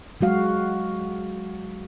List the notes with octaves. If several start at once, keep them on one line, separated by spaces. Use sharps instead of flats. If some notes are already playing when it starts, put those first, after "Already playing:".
F#3 G#3 F#4 F5